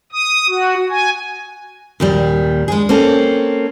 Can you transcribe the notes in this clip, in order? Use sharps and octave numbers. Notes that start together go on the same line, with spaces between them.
D#6
F#4
G#5
D#2 A#2 G3
G#3 D4 G#4
A#3 C4 C#4 A4